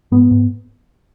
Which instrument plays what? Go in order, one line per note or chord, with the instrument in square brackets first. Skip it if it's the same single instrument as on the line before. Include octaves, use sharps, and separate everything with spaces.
[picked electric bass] G#2 B3
G#2